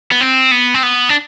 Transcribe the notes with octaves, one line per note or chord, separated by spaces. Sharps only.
B3
C4
B3
C4
B3
D4